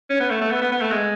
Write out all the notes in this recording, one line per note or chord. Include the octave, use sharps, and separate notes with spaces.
C#4
B3
A3
A3
B3
B3
B3
A3
G#3